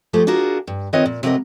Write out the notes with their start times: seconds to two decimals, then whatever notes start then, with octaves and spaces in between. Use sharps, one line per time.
0.13 F3 G3 A3 G4 G#4 C5
0.27 D4 F4 F#4 G#4 A#4
0.67 G2
0.93 D#3 C4 F4 B4 C#5 D#5
1.06 A#2
1.23 C3 F#3 G3 F4 A#4 D#5